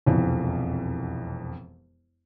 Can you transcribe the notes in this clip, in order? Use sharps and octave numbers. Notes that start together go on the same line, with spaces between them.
E1 C2 F2